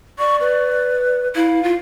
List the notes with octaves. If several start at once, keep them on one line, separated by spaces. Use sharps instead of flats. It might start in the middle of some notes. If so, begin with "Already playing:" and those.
D5 C#6
B4
E4 F5
F4